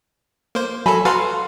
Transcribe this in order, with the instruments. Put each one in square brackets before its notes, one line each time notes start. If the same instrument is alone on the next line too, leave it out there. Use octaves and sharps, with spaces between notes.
[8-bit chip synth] A#3 C5
[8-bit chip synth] F#3 A4 [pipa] G#5 B5
[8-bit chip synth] F#4 B4 F5 [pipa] A4 A#5 C6